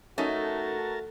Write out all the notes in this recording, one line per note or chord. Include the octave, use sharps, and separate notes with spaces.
A3 C#4 D#4 F#4 A4 A#4 A5